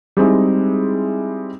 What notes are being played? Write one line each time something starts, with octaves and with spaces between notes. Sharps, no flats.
G3 G#3 C4 D#4 E4